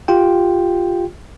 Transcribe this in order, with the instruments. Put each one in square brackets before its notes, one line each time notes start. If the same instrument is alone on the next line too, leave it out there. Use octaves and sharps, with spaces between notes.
[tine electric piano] F4 G4 G5